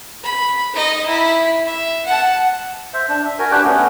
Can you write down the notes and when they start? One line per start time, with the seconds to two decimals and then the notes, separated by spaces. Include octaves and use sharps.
0.23 B5
0.74 D#4 D#5
1.06 E4 B5
1.66 E5
2.06 F#5 A5
2.94 C5 E5
3.09 D4
3.25 E5
3.39 F#4 A#4 G#5
3.51 D4 G4 B4 G5
3.64 A3 B3 C#4